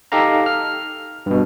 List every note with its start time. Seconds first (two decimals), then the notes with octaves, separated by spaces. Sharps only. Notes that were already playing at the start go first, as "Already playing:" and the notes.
0.12 D#4 G4 A4 F5 A#5
0.46 F6
1.26 G2 B2